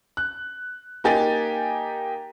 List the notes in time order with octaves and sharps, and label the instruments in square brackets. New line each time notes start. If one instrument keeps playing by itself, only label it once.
[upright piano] F#6
A#3 D#4 G4 G#5 A6